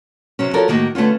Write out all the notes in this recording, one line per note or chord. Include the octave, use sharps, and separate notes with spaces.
C3 F#3 C#4
F3 F#4 A4 A#4 C#5 D5
A2 D#3 A#3 F#4
D3 A3 B3 C#4 F4